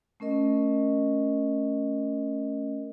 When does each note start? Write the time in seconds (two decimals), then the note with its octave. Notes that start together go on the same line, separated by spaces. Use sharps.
0.20 A3 C#4 A#4 D#5